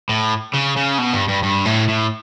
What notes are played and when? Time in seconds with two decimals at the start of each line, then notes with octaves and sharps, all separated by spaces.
0.09 A2
0.54 C#3
0.77 C#3
0.98 B2
1.13 G2
1.28 G2
1.43 G2
1.65 A2
1.88 A2